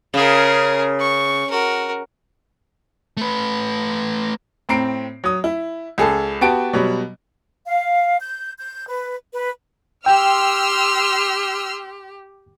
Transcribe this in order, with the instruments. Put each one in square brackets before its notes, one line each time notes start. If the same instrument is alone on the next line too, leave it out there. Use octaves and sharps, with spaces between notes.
[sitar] C#3 [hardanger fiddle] G#4 A#4
[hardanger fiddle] C#6
F#4 A#4
[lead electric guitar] A3 B4
[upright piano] A2 C4 A#5 C7 D7
F#3 D#6
E4
C#2 G#4 A4
B3 F#4 G4 G5 A5 D7
B2 F#3 G3
[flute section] F5
G6
G6
B4
B4
[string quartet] G4 [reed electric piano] G5 [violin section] C6 E6 F6